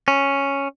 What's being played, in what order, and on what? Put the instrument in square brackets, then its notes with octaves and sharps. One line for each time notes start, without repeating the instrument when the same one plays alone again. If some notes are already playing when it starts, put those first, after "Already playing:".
[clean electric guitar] C#4